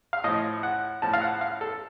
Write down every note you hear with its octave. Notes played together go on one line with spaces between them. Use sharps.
F5
A2 F3 D#5
F#5
A2 F3 A5
F5
F#5
F5
A4